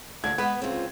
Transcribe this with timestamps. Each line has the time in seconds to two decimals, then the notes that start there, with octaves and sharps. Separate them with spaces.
0.24 D2 A#2 D3 G#6
0.38 G#3 B3 B4 F#5
0.62 C#2 C4 F4